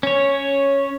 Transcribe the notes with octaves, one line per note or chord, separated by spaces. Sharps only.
C#4 C#5